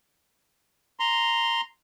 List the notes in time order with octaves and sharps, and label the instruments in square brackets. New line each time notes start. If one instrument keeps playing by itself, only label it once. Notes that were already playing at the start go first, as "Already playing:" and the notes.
[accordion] A#5 C6